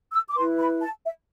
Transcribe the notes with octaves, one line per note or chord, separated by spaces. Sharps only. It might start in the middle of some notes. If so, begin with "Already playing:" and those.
E6
D6
E4 B4 C6
B5
A5
E5